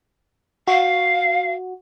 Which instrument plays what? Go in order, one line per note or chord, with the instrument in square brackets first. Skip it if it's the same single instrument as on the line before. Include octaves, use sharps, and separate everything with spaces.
[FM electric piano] F#4 [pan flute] F5